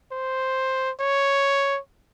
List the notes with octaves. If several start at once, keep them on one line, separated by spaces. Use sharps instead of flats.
C5
C#5